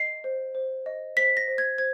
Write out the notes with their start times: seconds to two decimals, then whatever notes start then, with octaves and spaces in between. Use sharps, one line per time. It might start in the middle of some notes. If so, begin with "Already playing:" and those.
Already playing: D#5 C7
0.24 C5
0.55 C5
0.86 D#5
1.17 C5 B6
1.37 A#6
1.48 C5
1.58 G#6
1.78 C5 G#6